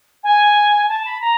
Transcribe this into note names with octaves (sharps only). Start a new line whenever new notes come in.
G#5
A5
B5
A#5